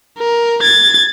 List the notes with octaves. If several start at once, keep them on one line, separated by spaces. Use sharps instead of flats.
A#4
G#6 A6